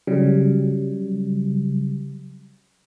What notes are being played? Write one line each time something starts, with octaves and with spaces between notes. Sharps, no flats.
C#3 F#3 G3